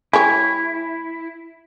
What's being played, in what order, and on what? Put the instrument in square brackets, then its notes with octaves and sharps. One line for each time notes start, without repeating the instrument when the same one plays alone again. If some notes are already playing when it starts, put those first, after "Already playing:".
[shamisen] G#3 G4 C#5 [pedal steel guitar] E4